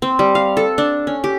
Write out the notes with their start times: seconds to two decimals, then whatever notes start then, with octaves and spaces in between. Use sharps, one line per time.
0.02 C4
0.19 G3
0.35 F5
0.57 A4
0.78 D4
1.07 C#4
1.24 G4